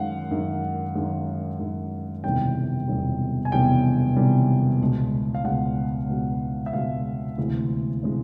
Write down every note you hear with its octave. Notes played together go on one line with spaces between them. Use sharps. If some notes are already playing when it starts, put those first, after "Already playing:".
Already playing: F#2 D#3 G#3 F5 F#5
F#2 D#3 G#3
F#2 D#3 G#3
F#2 D#3 G#3
E1 E2 C3 D#3 G3 G5
E1 E2 C3 D#3 G3
G#5
E1 E2 C3 D#3 G3 G5
E1 E2 C3 D#3 G3
C#2 B2 G#3
F5
C#2 B2 G#3 F#5
C#2 B2 G#3
E5
C#2 B2 G#3 F5
D2 C3 E3 G#3
C3 E3 G#3